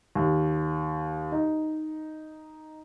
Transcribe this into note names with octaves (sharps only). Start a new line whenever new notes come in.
D#2
D#4